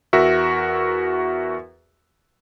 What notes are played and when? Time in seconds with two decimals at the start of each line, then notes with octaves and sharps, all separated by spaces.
0.13 E2 F#4 A#4 E5